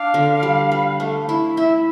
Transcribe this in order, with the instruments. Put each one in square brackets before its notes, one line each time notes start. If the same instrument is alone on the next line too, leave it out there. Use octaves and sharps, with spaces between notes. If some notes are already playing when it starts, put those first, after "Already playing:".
Already playing: [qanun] D4 [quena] F5
[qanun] D3
G3
B4
A3
E4
[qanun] E4 [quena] E5